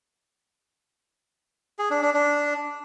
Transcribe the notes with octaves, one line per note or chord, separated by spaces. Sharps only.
G#4
D4
D4
D4